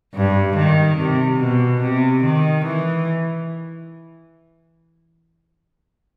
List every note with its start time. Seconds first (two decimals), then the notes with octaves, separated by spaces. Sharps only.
0.15 G2
0.56 D#3
0.97 C3
1.40 B2
1.81 C3
2.23 D#3
2.65 E3